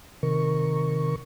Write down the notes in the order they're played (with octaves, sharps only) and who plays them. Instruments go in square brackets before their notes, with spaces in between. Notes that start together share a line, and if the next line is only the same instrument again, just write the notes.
[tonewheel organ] C3 D#3 A#4 C#6